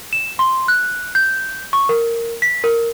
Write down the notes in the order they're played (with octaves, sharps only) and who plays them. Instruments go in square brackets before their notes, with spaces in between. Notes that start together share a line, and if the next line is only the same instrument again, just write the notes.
[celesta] E7
C6
F#6
G6
C#6
A#4
B6
A#4